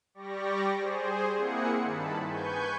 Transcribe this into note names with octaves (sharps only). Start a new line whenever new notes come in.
G3 G4 D5 C#6 A#6
G#4 C5
A#3 C4 E4 G#4 F#5 C#7
G2 D#3 A5 B5
B4 G#5 C#6 G6